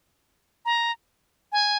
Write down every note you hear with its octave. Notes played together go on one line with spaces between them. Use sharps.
A#5
G#5